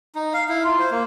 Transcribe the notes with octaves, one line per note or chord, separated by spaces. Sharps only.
D#4
F5
E4
F4
C5
A#3